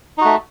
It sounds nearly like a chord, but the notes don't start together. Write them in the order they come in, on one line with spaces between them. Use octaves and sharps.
D#4 F#4 A3